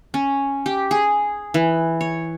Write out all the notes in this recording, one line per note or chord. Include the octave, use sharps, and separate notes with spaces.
C#4
G4
G#4
E3
C#5